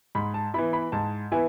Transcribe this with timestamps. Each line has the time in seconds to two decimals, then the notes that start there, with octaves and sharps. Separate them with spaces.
0.15 G#2 B5
0.34 A5
0.54 E3 B3 E4 B5
0.73 B5
0.92 G#2 A5
1.32 E3 B3 E4 G#5